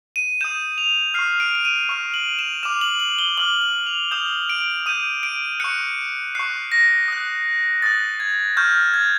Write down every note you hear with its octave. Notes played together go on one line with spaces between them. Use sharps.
D#7
D#6 G6 E7
F7
C#6 F6 C7
D7
D7
D#7
C#6 F6
F#7
E7
D6 F6 E7
F#7
F#7
G7
D6 F6 F#7
F#7
F7
D#6 G6 E7
D7
D#6 G6 D#7
D7
C#6 F#6 C#7
C#6 F#6 C7
A#6
D#6 F#6
D#6 F#6 A6
G#6
C#6 F6 G6
G#6